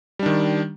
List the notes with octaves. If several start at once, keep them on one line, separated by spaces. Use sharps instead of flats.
D#3 G3 D4